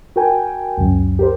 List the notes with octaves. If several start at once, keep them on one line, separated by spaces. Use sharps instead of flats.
F#4 A#4 G5 G#5
C#2 F#2
G4 A#4 C5